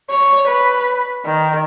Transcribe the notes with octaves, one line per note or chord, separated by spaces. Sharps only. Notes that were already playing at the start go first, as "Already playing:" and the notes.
C#5
B4
D#3